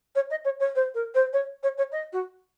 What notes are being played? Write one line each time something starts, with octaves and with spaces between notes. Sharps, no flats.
C#5
D#5
C#5
C#5
C5
A#4
C5
C#5
C#5
C#5
D#5
F#4